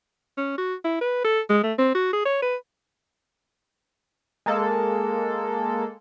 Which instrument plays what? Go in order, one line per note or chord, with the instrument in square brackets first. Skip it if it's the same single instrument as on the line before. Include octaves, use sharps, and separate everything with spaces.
[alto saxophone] C#4
F#4
E4
B4
A4
G#3
A3
C4
F#4
G#4
C#5
B4
[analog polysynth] G#3 A#3 A4